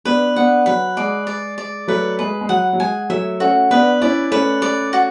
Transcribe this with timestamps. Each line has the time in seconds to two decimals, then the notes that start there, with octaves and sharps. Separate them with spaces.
0.05 B3 D4 B4
0.36 B3 D4 F#5
0.66 F#3 B4
0.97 G#3 D5
1.27 D5
1.58 D5
1.88 F#3 A3 B4
2.19 G#3 B4
2.41 G#3
2.49 F#3 F#5
2.73 F#3
2.80 G#3 G#5
3.10 F#3 A3 E5
3.40 A3 C#4 F#4
3.71 B3 D4 B4
4.01 C#4 E4 D5
4.31 A3 C#4 B4
4.62 D5
4.93 F#4